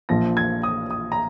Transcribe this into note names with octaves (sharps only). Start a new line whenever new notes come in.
A#1 A#2 F3 A#6
G#6
D#6
D#6
A#5